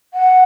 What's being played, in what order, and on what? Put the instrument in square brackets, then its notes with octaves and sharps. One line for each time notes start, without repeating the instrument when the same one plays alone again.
[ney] F#5